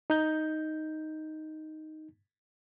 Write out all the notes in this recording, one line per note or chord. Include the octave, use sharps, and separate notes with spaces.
D#4 G6